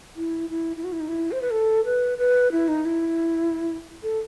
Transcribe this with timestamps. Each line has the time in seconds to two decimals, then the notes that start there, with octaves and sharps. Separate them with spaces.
0.16 E4
0.50 E4
0.76 E4
0.84 F#4
0.92 E4
1.00 D#4
1.08 E4
1.32 C5
1.42 B4
1.50 A4
1.85 B4
2.18 B4
2.52 E4
2.68 D#4
2.85 E4
4.03 A4